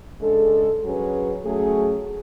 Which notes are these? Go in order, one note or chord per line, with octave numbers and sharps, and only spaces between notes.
C#3 G#3 D4 A4
F#3 C#4 G#4 B4
F#3 A3 C#4 G#4